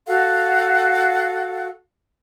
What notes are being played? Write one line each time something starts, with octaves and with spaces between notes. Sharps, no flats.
F#4 A4 F5 F#5